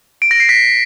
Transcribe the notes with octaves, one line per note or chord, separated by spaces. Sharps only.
D7
A#6
C7
B6